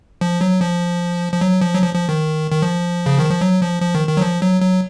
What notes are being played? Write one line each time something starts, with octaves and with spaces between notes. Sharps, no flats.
F3
F#3
F3
F3
F#3
F3
F#3
F3
F3
D#3
D#3
F3
C#3
D#3
F3
F#3
F3
F3
D#3
D#3
F#3
F3
F#3
F#3